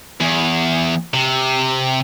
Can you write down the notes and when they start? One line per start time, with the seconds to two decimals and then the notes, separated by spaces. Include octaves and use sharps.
0.20 E2
1.14 C3